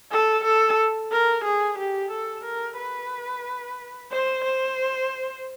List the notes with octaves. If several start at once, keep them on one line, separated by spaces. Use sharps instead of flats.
A4
A4
A#4
G#4
G4
A4
A#4
B4
C5
C5